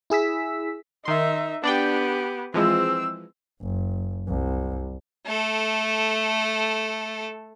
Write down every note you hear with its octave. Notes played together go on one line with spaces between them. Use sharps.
E4 G#4 E6 B6
D#3 D#4 E5 C6
B3 D4 G4 D5 G5
E3 F3 G#3 C4 E6
F#1
C2
A3 A4